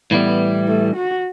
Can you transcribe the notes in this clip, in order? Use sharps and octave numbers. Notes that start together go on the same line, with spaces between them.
A2 E3 G3 B3
A3
F#4